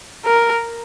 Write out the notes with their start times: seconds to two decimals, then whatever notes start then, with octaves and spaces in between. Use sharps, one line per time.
0.25 A#4